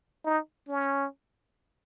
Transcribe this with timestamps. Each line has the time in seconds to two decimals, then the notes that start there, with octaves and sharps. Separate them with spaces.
0.25 D#4
0.68 C#4